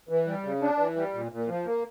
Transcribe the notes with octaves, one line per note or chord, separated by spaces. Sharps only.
E3
G3
C#3
D4
E3
G3
A#2
A#2
F3
A#3